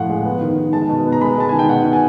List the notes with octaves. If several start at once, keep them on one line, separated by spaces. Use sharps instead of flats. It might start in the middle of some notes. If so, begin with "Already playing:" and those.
Already playing: A2 F3 F5 F#5
G#3
B3
D#3
D#3
G#3 A5
B2
B3
A#5
G#3 B5
G#3 A5
D#3 G#5
G5
B2 F#5
B2
G#5